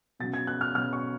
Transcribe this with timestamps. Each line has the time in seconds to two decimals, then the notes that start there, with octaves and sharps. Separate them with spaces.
0.19 B2 F#3 C#4 A6
0.34 G#6
0.47 F#6
0.61 F6
0.74 B2 F#3 C#4 F6
0.93 C#6